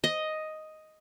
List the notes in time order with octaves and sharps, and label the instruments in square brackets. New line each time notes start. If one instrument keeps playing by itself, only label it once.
[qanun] D#5